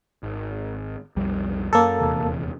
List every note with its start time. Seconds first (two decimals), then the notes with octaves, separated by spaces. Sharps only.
0.23 G#1
1.16 B1 F2 G3
1.73 F#2 A#3 A4
2.00 D#1 E2 C3